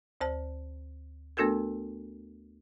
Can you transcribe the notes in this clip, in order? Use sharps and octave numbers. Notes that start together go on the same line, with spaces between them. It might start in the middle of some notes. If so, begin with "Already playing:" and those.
D2 C5 A5
A3 B3 D4 F#4 A4 A#4